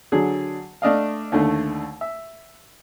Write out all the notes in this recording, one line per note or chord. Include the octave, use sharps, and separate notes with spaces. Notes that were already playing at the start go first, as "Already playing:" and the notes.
D3 F#3 G#4
A3 D4 D#5 F5
D#2 D3 A3
E5